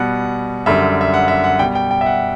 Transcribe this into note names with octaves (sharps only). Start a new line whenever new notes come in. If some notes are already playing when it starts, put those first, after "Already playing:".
Already playing: B2 G3 F#5
F#2 D3 G3 E5
E5
F#5
E5
F#5
B2 G3 G5
G5
G5
E5
F#5